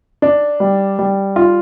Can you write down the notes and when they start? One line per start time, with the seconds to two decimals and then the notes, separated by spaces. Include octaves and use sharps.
0.22 D4
0.60 G3
0.99 G3
1.36 F4